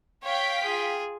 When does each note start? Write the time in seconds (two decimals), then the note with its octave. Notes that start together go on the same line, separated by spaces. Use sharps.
0.24 C#5 F5 G5 B6
0.64 F4 G#4